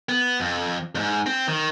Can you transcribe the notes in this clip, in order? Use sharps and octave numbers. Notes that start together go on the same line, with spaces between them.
B3
F2
F2 G#2
C4
D#3